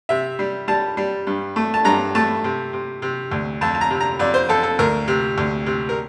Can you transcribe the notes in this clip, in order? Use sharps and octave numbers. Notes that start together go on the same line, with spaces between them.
C3 E5
G3
G3 A5
G3
G2
A3
A5
G2 A#5
A3 A5
C3
C3
C3
D2
F2 A5
A5
A#5
C3
A#5
F2 D5
C5
F2 A4
A4
D2 A#4
C3
D2
C3
A#4